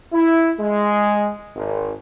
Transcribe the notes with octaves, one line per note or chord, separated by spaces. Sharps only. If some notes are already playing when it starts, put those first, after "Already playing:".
E4
G#3
G#1